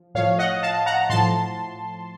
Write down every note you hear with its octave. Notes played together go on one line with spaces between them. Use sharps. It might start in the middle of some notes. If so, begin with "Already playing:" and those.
Already playing: F3
A2 F3 C#5 F5
D#5 F#5
F5 A5
F#5 A#5
A2 F3 A5 C6